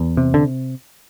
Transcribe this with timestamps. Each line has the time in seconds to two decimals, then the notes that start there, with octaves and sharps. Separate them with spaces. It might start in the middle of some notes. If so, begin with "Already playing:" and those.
Already playing: E2
0.17 C3
0.34 D3